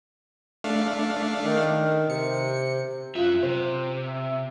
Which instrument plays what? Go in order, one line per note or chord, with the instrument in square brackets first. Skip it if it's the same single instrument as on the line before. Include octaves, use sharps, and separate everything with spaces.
[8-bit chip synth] A3 D4 F5
[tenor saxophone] D#3
[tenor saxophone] C3 [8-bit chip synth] C#7
[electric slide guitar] F#2 E5 [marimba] F4 F5 [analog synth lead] F#6
[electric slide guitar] C3 [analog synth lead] C5
[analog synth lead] E5